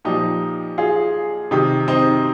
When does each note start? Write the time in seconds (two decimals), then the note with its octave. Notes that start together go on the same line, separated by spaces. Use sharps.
0.05 A#2 F3 D#4 G4
0.78 F4 G#4
1.51 C3 D#3 D#4 G4
1.88 C4 D#4